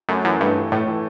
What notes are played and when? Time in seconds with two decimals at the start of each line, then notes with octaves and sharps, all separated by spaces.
0.09 F#2 A3
0.24 F#2 E3
0.40 G2 A3
0.56 E3
0.72 A2 A3
0.88 E3